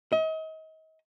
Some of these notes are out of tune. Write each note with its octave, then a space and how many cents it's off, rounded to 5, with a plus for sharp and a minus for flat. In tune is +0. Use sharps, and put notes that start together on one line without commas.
D#5 +35